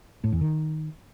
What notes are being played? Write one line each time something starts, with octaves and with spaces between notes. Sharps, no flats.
A2
E2
D#3